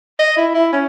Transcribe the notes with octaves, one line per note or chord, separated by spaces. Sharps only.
D#5
E4
E4
C#4